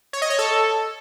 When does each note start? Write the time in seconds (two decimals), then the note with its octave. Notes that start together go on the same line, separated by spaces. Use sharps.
0.13 C#5
0.22 D#5
0.30 C#5
0.39 A4